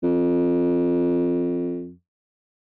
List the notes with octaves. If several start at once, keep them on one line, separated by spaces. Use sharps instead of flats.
F2